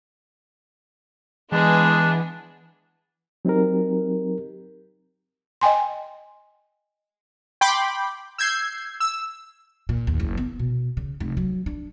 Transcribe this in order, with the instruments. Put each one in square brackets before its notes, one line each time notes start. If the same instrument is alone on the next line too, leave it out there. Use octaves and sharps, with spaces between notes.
[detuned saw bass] E3 [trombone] G#3 [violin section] B3 G#4 [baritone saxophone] D4
[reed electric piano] F#3 C4 D#4 G4 A#4
[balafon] D#5 G5 G#5 C6
[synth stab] G5 B5 C6 D6 G6
E6 G6 G#6 C7
E6
[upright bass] A#2
D#2
F#1
B3
B2
C#3
F1
F#3
D4